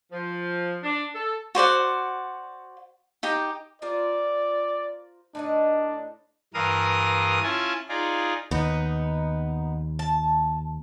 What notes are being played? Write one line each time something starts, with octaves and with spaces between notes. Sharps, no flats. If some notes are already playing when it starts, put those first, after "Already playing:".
F3
D4
A4
F#4 C5 D5 F#5
D#4 G4 G5
F4 A#4 C5 D5
A2 D4 D#4 D#5
G2 E3 A#4 F5 D#6
C#4 E4 F4 G#5 A5
D#4 F4 G#4 D5
D#2 B3 D#4
A5